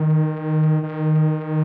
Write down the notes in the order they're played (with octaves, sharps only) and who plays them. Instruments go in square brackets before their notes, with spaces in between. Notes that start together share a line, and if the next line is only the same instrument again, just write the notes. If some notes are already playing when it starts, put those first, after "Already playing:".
Already playing: [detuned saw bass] D#3
D#3